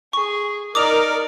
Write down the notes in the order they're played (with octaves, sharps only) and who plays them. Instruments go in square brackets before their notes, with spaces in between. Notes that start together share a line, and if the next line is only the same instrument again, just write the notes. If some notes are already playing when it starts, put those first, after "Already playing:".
[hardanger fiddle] G#4 [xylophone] C#6
[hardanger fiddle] D#4 D5 [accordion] A#4 [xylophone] D6 D#6 F7